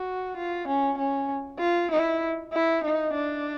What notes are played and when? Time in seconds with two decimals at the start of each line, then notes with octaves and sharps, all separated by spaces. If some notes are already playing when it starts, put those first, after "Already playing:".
Already playing: F#4
0.37 F4
0.67 C#4
0.98 C#4
1.59 F4
1.91 E4
2.53 E4
2.84 D#4
3.15 D4